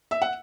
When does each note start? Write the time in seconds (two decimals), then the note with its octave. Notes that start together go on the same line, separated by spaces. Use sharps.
0.11 E5
0.22 F#5